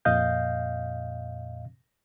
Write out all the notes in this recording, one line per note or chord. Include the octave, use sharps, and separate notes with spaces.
F2 A#2 D#5 F5 G6